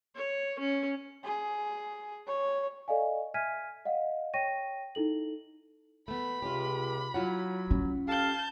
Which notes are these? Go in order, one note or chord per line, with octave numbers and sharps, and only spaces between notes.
C#5
C#4
G#4
C#5
A4 D5 D#5 F5 G#5
E5 G#5 F6 G#6 B6 D#7
D#5 F5 F#5
C#5 G5 C#6 A#6 D#7
D#4 E4 A4 F#7
A3 B3 B5
C#2 C3 F4 G4
F#3 E4 F4 F#5
C#4
G4 A4 F5 A5 G6